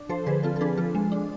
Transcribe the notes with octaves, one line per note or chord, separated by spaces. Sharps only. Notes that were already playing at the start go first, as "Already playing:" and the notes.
Already playing: D4
F3 A4 C5
D3 G#4 B4
C4 F4 A4
A4
D4 G#4 B4
F3 F4 A4
G#3
D4